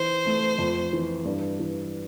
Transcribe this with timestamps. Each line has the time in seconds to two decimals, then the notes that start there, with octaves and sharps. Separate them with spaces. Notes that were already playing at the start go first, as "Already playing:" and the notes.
Already playing: E3 C5
0.26 A3
0.58 F2
0.93 E3
1.25 G2
1.60 E3